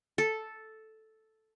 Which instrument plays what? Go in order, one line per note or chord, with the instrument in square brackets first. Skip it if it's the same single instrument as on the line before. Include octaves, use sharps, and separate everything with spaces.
[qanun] A4